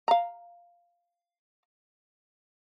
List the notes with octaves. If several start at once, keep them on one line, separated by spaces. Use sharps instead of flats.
F5 A#5